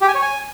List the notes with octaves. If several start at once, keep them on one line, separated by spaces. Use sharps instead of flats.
G4
G#5
C#5
G#5